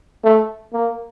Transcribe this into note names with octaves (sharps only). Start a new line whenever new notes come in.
A3
A#3